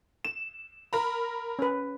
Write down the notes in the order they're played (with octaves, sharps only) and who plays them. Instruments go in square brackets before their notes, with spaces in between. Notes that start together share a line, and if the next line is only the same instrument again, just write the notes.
[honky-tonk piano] E7
A#4 A#5 B5
[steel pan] C#4 B4